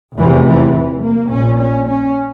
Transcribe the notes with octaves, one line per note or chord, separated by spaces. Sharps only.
F1 E2 C3 E3
E3
E3
A#3
A#1 A#2 C#4
C#4
C#4